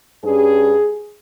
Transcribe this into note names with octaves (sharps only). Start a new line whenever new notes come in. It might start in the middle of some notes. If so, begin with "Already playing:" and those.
G2 G3 C#4 G#4